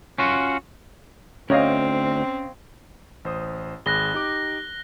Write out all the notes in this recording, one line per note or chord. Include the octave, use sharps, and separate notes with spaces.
C#4 F4 F#4
D2 C4 C#4 C#5 D#5 F5
A1 C5 D#6
G#1 G#4 B5 F#6 A#6 G7
D#4 G4 D6